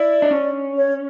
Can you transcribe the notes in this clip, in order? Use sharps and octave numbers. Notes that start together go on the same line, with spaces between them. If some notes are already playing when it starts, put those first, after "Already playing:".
Already playing: E4 D5
D4
C#4
C#5